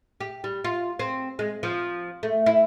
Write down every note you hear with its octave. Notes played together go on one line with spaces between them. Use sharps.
G4
G3
F4
C4
G#3
F3
A3
E4